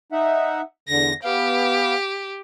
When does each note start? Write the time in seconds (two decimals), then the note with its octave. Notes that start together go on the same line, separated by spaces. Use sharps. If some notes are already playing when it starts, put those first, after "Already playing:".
0.12 D#4 E5 F#5
0.89 E2 D3 A#6
1.24 B3 G4 F5